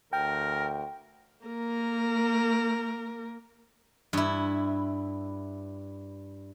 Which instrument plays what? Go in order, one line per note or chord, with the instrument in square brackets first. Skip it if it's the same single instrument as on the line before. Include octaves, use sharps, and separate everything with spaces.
[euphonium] D2 [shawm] A#4 [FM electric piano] G5
[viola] A#3 A#4
[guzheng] G2 E4